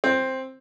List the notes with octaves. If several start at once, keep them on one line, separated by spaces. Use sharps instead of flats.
C4